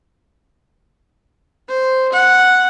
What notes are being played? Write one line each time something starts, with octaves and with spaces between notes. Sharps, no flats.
C5
F#5